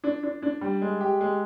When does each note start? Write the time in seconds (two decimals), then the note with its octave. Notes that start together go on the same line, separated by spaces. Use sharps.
0.04 D4
0.23 D4
0.42 D4
0.61 G3
0.81 G#3
1.01 G4
1.21 G#3